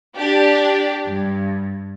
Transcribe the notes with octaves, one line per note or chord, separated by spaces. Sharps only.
D4 G4
G2